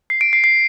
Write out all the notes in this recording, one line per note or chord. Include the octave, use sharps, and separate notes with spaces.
C7
D7
C7
C7